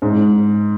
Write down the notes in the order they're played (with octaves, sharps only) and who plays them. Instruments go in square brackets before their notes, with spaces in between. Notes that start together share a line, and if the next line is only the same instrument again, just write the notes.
[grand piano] G#2